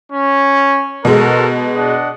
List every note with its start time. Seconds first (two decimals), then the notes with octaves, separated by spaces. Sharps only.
0.11 C#4
1.05 B2 G#3 F#4 A4 A#4
1.76 D4 D#5 F#5